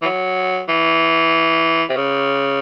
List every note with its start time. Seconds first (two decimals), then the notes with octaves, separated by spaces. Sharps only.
0.02 E3
0.05 F#3
0.69 E3
1.89 C3
1.97 C#3